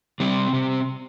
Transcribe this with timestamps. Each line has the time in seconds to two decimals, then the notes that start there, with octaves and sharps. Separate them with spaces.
0.20 C3 G3 C4
0.53 C3